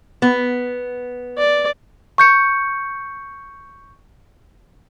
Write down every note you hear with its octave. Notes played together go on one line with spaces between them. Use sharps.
B3
D5
C#6 G6 C#7